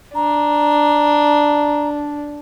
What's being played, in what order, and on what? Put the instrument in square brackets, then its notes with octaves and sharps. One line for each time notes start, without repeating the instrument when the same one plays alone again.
[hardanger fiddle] D4 [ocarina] A#5